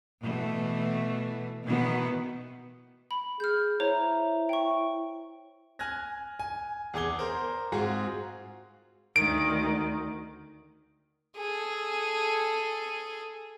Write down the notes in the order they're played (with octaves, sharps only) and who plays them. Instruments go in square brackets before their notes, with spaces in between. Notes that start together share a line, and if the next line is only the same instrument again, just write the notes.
[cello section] B2 E3 A3
B2 D#3 E3 B3
[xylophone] B5
[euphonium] G#4 [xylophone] F6 G6
[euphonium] E4 [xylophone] C5 C#5 A#5
[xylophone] G5 C#6
[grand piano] G#5 F6 F#6 G#6 A#6
G#5
E2 G#4 D6 G#6 G7
A#4 C5
G#2 G#3 C4 F4 F#4 G#4
[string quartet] D2 D#3 [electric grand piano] D7
[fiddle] G#4 A4